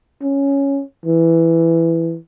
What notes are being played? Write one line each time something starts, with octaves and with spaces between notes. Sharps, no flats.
C#4
E3